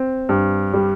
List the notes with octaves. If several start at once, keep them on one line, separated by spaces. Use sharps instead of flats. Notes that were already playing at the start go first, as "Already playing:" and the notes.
Already playing: C4
G2
G3